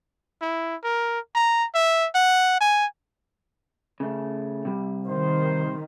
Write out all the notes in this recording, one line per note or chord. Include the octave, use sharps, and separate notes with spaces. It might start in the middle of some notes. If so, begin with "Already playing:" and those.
E4
A#4
A#5
E5
F#5
G#5
C#3 A3
C3 G3
D#3 C5